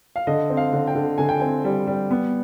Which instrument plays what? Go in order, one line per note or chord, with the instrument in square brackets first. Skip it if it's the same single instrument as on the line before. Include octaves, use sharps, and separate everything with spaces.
[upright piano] F5
D3 D#5
C4
F5
D3
G5
D3
D3 G#5
G5
C4 G#5
G3
G3
B3